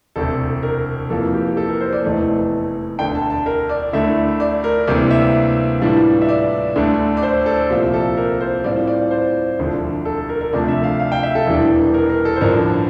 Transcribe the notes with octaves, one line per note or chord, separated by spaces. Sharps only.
E1 D2 C3 A4
A#4
F2 E3 A#3 F4 A4
G4
G4
A4
A#4
C5
D5
F1 E2 E3 A3
E1 D2 D3 G5
A5
A5
A#4
D5
D2 D3 A3 E4 E5
D5
A#4
D2 C3 E3 G3 A#3 D5
E5
A2 E3 G3 D4 F4
E5
D5
D2 D3 A3 D4
D5
C5
A4
C2 A#2 F3 C4 F4 G4
A4
A#4
C5
A2 G3 C4 F4 D5
D5
C5
E1 D2 D3 F3
A4
A4
A#4
A#4
D2 C3 F3 A3 D4 D5
E5
F5
F5
G5
E5
A4
E1 E2 E3 G3 D4
A#4
A#4
A4
C5
A1 G2 D3 F3 A#4